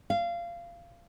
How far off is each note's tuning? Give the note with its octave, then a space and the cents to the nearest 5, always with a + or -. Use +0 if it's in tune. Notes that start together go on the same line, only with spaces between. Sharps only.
F5 -20